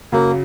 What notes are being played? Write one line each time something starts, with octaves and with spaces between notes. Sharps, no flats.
F#2 C#3 F#3 A#3